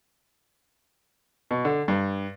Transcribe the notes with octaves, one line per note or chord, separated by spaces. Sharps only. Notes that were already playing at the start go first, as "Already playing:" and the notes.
B2
D3
G2